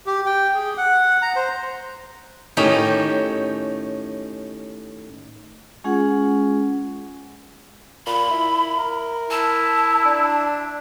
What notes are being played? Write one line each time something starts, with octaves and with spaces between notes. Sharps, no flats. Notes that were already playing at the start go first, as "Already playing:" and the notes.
G4
G5
G#4
F#5
A#5
C5
A2 D#3 C#4 D#4 G4
G#3 C#4 F4 G#4 F#5
A#2 B5
E4
A#4
E4 A5
D4